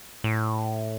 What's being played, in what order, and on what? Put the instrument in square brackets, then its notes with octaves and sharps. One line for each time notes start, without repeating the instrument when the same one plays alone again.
[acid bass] A2